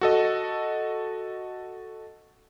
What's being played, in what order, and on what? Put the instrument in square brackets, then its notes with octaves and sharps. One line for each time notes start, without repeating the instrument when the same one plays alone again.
[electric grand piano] F#4 A4 D#5